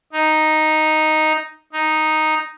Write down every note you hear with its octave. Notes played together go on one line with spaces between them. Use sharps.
D#4
D#4